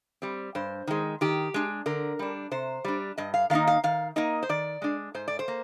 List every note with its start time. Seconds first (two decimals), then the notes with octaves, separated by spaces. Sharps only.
0.22 G3 C4
0.55 G2 C5
0.87 D#3 G#3
1.21 D#3 G4
1.54 G#3 D4
1.86 D3 A#4
2.19 G3 D4
2.51 C3 C5
2.84 G3 D4
3.18 G2 D#5
3.34 F5
3.50 D#3 A#3 D#4 F5
3.67 F5
3.84 D#3 F5
4.16 A#3 D#4 D#5
4.43 C5
4.49 D#3 D5
4.82 G#3 D4
5.14 G#2 C5
5.28 D5
5.39 C5
5.48 A#3